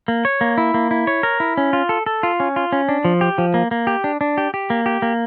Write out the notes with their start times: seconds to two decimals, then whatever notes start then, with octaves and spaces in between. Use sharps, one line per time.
0.08 A#3
0.25 C#5
0.41 A#3
0.58 E4
0.74 A#3
0.91 E4
1.07 C#5
1.23 A#4
1.40 E4
1.57 C#4
1.73 F4
1.89 A4
2.06 A4
2.23 F4
2.40 C#4
2.56 F4
2.72 C#4
2.89 D4
3.05 F3
3.21 G4
3.38 F3
3.54 A#3
3.71 A#3
3.87 G4
4.04 D4
4.21 D4
4.38 G4
4.54 G4
4.70 A#3
4.86 G4
5.02 A#3